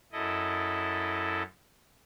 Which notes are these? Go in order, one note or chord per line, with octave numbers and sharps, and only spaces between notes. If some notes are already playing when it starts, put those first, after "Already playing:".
F#2 E4 A4 D#5